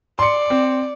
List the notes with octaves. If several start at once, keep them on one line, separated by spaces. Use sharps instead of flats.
D5 C6 C#7
C4